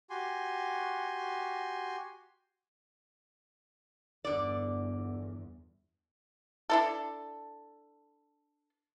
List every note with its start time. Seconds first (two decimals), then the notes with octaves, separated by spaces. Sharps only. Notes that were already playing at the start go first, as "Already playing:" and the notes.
0.10 F#4 G4 G#5 C6
4.25 G1 E2 D3 D5
6.70 D4 E4 A4